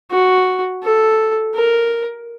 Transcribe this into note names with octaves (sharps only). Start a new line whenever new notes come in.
F#4
A4
A#4